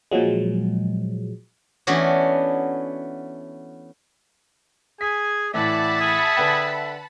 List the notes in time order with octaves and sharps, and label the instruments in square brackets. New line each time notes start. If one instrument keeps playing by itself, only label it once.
[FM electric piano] A#2 F3 F#3 G#3
[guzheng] E3 A3 B3 C#4 D4 F#4
[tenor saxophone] G#4 [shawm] G#5 [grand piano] B6
[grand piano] A2 E3 [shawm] D5 [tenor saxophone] E5 [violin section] F#5 A5 B5
[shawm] G#4
[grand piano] D3 B4 G5